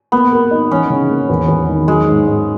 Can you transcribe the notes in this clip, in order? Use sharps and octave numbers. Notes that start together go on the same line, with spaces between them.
A#3 B3
A#4
D#4
E3 C#4
C#3
A#3
E2
E2
D#3
F#3 G#3
G#2
G#2